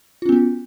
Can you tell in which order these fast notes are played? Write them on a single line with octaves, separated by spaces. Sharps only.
F4 C#4 B3 F#4